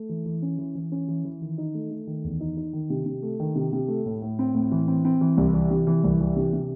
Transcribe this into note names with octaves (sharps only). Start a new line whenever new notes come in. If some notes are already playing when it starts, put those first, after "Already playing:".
Already playing: A3
E3
E3
C#4
E3
E3
C#4
E3
E3
D#3
D#4
A3
A3
D#3
E2
D#4
D#4
D#3
C3
C3
A3
D#3
C3
C3
A3
A2
A2
C4
A2
E3
C4
C4
E3
C2
E3
C3
E3
C2
E3
C3
C3